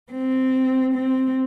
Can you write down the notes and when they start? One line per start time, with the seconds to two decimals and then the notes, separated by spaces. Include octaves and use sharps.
0.11 C4
0.93 C4